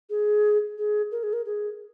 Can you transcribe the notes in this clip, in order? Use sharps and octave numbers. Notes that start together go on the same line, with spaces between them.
G#4
G#4
A#4
G#4
A#4
G#4